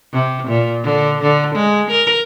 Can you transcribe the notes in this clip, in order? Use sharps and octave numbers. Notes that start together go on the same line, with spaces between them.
C3
A#2
D3
D3
G#3
A#4